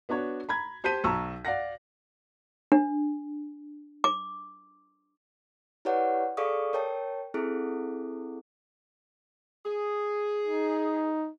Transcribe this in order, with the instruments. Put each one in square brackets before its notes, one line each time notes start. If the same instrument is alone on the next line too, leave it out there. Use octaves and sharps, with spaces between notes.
[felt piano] B3 D4 F#4 C#5
A#5 B5 G#6
G4 C5 A5 G6 B6 D#7
B1 A5 A#5 C#6 E6
D5 F5 F#5 A#6
[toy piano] D4
D6
[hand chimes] E4 G4 B4 C#5 D5 F#5
G#4 A4 D5 F5 C#6 D#6
A#4 C#5 G5 A5
C4 E4 G#4 A4
[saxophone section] G#4
[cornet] D#4